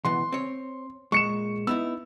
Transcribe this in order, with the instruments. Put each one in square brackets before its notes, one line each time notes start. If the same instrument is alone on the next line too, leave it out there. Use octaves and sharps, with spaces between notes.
[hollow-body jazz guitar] B2 E3 B3 [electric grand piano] C6
[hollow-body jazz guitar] C4 C#5
[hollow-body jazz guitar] A#2 G#3 [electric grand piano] C#6 C#7 E7
[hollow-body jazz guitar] B3 D#4 E4 [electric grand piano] E6